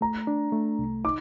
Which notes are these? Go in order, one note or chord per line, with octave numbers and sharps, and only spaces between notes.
A3 A#5
D4
A3
C2
D#4 D6